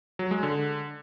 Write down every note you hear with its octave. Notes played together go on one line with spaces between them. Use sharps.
F#3
G#3
D3